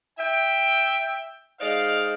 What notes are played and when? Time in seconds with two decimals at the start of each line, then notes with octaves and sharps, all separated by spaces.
0.19 E5 G5
1.60 G#3 D#4 C5 D5 F5